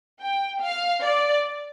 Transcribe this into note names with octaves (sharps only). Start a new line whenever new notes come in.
G5
F5
D5